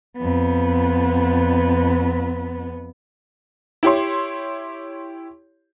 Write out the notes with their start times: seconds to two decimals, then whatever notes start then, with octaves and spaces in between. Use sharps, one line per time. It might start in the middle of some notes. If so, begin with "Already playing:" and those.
0.17 F2 B3
3.83 E4 G4 C#5 C6